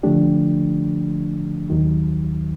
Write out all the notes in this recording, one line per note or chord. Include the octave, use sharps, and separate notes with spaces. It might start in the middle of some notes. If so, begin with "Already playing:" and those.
D3 F3 A3 D4 G4
D#2 D#3 F#3